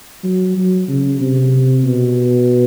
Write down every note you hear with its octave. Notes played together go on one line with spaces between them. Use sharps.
F#3
F#3
C#3
C3
B2